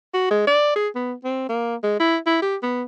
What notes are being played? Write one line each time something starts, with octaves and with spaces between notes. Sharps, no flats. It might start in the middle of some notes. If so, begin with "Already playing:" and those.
F#4
G#3
D5
G#4
B3
C4
A#3
G#3
E4
E4
G4
B3